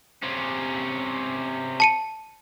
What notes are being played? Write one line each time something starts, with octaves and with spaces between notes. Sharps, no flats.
C3 C#4
A5 C#7 D#7